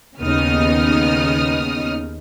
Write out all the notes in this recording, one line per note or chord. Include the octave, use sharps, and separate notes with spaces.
D#2 C#3 B3 D#4 D#6 F6